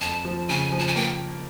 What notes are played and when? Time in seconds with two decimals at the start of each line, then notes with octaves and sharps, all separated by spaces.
0.01 F2 A5
0.25 F3
0.49 C#3 G#5
0.72 F3
0.79 A5
0.88 G#5
0.95 A#3 G5